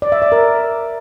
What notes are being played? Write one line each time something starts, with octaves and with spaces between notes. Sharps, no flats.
D5
E5
D5
A#4